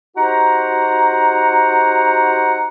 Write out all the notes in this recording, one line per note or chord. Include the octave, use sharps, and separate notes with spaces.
D#4 F#4 G4 C5 F#5 A#5